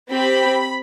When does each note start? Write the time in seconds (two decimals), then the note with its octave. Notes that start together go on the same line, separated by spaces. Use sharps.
0.11 C4 G4 B5